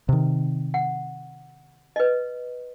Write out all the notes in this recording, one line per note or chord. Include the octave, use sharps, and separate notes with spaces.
C3 D#3
F#5
B4 D#5